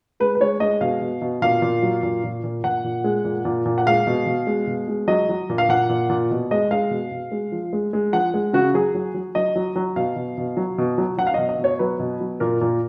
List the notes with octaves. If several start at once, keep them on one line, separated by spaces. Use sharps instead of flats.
G#3 B4
B4
G#3 C#5
G#3 D#5
B2 F5
B2
B2
A#2 F5
A#2
F#3
A#2
A#2
A#2
A#2 F#5
A#2
G#3
A#2
A#2
A#2
F#5
G#3 F5
B2
B2
G#3
B2
G#3
F#3 D#5
F#3
A#2
F5
A#2 F#5
A#2
A#2
B2
G#3 D#5
G#3 F5
B2
B2
G#3
F3
G#3
G#3
F3 F#5
G#3
C#3 F#4
F#3 G#4
F#3
F#3
F#3 D#5
F#3
F#3
B2 F5
B2
B2
F#3
B2
F#3
F#3 F#5
F5
B2 D#5
D#5
B2
C#5
F#3 B4
B2
F#3
A#2 A#4
A#2